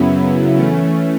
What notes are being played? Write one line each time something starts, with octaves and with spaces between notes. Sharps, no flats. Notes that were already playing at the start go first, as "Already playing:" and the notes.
Already playing: F#2 C#3 F#3 B3 E4
E3 A3 C#4